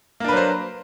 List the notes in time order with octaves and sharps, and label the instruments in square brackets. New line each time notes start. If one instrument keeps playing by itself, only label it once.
[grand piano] A#3
D4
B4
F#3
C5